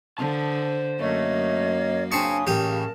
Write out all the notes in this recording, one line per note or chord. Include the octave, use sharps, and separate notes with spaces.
D3 C5 A5
F#2 A3 A#3 C#5 D#5
C#3 C4 D4 G#5 A5 C#6 D#6
A1 G4 A#4 A5 D#6